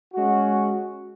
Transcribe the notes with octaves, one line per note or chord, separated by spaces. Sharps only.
G#3 C#4 F#4